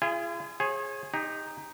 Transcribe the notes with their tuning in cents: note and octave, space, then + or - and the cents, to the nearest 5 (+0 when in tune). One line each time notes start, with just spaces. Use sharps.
F4 -45 G#4 +0 G#5 -30
G#4 +0 C#5 -45
D#4 +0 G4 +35